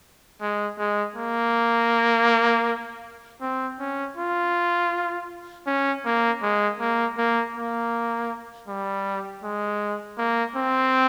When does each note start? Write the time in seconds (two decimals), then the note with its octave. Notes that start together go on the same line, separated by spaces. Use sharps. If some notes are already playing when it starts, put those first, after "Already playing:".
0.41 G#3
0.78 G#3
1.16 A#3
3.41 C4
3.80 C#4
4.17 F4
5.66 C#4
6.05 A#3
6.42 G#3
6.80 A#3
7.18 A#3
7.55 A#3
8.68 G3
9.43 G#3
10.18 A#3
10.56 C4